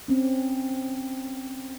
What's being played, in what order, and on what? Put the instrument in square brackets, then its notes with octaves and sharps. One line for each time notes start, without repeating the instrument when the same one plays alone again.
[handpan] C4 C#4